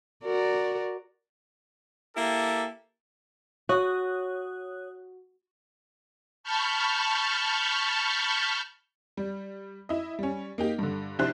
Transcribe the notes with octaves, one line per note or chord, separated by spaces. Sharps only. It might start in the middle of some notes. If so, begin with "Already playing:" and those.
F#4 A#4 D5
A#3 E4 G4 A4
F#4 C#5 D#6 F#6
A5 B5 C#6 F6 G6
G3
E4 D#5
G3 C#4
A#3 D#4 G4
G2 D3
F1 D4 E4 G4 C5 F#6